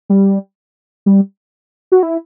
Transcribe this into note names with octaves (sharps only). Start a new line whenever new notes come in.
G3
G3
F#4
E4